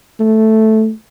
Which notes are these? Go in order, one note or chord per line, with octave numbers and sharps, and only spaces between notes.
A3